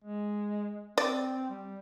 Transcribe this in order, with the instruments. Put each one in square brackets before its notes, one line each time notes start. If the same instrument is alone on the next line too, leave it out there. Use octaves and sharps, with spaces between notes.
[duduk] G#3
[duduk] C4 [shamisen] D5
[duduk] G3